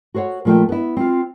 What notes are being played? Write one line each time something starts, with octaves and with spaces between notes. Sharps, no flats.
F#4 A4 C5 C#5 F#5
A#2 F3 A3 F4 E5 G5
B3 E4
C4 F4